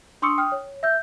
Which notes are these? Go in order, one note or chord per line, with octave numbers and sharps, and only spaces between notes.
D4 C6 C#6 D#6 E6 C#7
G5 D#6 F6
C#5
E5 E6 G6